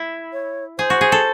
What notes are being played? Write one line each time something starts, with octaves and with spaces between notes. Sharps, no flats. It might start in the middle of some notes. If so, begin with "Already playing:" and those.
Already playing: E4
C#5
G#4 C5
F#4
G#4
A4